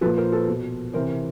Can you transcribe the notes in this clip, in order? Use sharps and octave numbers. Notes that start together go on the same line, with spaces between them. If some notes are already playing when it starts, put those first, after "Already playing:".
A#2 F3 A4 B4
A#4 C5
A4 B4
B2
C3 E3 A#4 C5